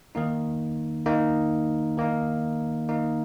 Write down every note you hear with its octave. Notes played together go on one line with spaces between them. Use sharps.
D#3 A#3 D#4
D#3 A#3 D#4
D#3 A#3 D#4
D#3 A#3 D#4